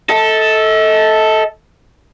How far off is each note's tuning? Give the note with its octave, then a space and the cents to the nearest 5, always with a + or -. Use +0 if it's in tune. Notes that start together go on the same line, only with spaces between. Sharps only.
A4 +0 D#5 +40